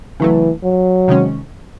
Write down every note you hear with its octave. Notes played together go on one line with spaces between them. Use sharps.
C#3 E3 F#3 A3
F#3
C3 D#3 G#3 C#4